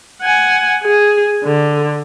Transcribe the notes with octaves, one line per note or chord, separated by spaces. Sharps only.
F#5 G#5
G#4
D3